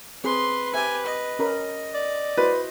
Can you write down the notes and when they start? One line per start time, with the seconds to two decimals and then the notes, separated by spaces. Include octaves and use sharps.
0.24 C4 G#4 B4 C6
0.74 G4 C5 E5 G#5
1.06 D#5
1.39 C#4 A#4 B5
1.94 D5
2.38 E4 F#4 B4 C5